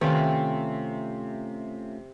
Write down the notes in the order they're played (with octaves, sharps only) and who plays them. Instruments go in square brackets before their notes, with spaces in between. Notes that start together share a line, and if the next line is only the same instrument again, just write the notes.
[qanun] C3 [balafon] D#3 [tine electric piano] A3 C#4 F4